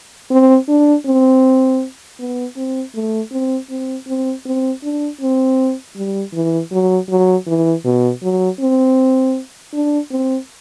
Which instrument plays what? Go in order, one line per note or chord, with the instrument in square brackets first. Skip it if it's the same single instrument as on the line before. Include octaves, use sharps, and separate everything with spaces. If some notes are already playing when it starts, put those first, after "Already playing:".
[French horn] C4
D4
C4
B3
C4
A3
C4
C4
C4
C4
D4
C4
G3
E3
F#3
F#3
E3
B2
F#3
C4
D4
C4